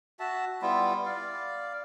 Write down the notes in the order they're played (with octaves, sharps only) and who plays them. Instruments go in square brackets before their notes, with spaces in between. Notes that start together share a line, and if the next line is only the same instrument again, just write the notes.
[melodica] F#4 E5 A5
G3 B3 E4 F4
D5 F5